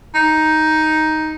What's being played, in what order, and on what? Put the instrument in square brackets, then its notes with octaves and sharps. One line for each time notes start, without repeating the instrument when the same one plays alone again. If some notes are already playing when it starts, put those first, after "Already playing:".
[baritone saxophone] D#4